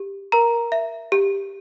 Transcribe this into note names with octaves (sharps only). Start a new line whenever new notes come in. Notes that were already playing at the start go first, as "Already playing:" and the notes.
Already playing: G4
A#4 A#5
E5
G4